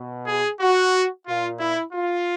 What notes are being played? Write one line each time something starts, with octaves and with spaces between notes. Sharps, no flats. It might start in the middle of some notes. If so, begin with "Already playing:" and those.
Already playing: B2
G#4
F#4
A#2 F4
E4
F4